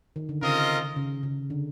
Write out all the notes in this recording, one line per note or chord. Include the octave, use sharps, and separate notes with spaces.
D#3
D3
C#3 C4 F4 A#4 D#5
C#3
C#3
D3